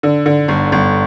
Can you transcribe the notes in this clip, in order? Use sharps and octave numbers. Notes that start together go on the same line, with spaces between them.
D3
D3
G1
G1